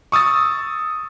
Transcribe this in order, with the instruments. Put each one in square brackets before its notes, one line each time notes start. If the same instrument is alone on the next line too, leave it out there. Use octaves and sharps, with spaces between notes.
[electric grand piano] C#6 D#6 E6 A6